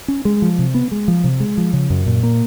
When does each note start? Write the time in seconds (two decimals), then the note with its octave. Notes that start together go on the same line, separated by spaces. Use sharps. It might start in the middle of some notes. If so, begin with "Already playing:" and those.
0.08 C#4
0.25 G#3
0.42 F3
0.59 C3
0.74 B3
0.92 G#3
1.08 F3
1.24 C3
1.40 G#3
1.57 F3
1.73 C#3
1.90 F#2
2.06 A#2
2.23 A#3